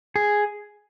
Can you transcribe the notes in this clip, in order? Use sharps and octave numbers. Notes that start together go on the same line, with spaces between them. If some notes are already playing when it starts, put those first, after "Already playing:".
G#4